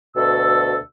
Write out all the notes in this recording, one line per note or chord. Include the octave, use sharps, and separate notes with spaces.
D2 B2 A4 E6